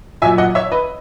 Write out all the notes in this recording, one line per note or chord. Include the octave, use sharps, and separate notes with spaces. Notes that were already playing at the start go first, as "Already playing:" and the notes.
A#2 F#3 E5 G#5
D#5 F#5
C#5 E5
B4 D#5